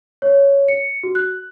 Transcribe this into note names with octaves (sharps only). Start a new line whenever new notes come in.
C#5
C#7
F#4
F#6